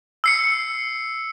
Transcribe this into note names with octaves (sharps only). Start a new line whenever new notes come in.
E6 C7 C#7